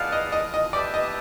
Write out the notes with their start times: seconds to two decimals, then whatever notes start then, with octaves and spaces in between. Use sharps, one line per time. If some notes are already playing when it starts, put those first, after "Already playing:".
Already playing: G#4 B4 D5 F5 F#5 A5
0.12 D#5
0.32 D#5
0.54 D#5
0.73 G4 B4 D5 E5 A5
0.94 D#5